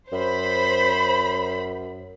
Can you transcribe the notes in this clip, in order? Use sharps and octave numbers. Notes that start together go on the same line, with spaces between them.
F#2 C5 B5